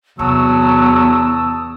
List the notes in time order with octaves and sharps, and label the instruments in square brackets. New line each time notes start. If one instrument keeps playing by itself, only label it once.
[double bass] E2 [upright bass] C3 [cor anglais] F#3 [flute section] A5 D#6 E6